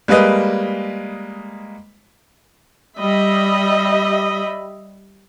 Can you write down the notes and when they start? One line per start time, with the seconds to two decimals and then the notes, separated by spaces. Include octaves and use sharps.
0.08 G3 G#3 A#3 B4 D#5
2.98 G3 D#5 E5 B5